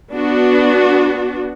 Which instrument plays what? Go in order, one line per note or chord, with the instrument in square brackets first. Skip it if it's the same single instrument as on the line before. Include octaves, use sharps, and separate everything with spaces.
[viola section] B3 D4 F#4